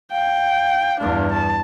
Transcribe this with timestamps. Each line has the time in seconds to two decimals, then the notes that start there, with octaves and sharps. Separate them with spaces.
0.12 F5 G5
1.01 E2 G2 D4
1.32 A5